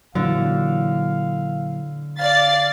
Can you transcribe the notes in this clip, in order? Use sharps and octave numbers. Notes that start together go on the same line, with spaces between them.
A#2 D3 E3 F#3 F5
D5 F5 A6 C7